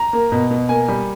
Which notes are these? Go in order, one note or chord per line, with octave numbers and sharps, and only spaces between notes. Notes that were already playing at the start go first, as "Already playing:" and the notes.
Already playing: A#5
A#3
B2
B2
A#3 G#5
G3